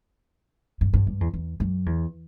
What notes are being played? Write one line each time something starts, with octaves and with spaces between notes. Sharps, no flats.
G2
G2
G2
E2
E2
F#2
E2